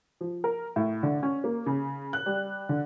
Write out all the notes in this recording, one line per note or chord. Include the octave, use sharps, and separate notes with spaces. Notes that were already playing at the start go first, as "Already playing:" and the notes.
F3
A#4
A2
D3
C#4
A#3
C#3
F#6
G3
D3